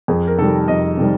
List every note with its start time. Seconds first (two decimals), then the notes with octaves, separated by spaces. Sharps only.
0.08 F2 G#4
0.28 A#4
0.38 C3 D#3 G3 A4
0.68 F2 D#5
0.98 C3 D#3 G3